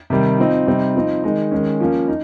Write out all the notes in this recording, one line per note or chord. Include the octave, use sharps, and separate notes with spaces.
C3 D#3 G3
F3 C4 D#4
C3 G3 C4 D#4
F3 C4 D#4
D#3 G#3 D#4
D#3 G#3 C#4
F3 A#3 C#4
D#4